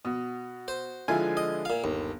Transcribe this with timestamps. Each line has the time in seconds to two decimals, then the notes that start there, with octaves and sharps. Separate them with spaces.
0.05 B2 F#4 D#6
0.68 C5
1.08 D3 F3 G#3 E4 F4 G#5
1.37 D#5
1.65 A#2 F5
1.84 G1 D#2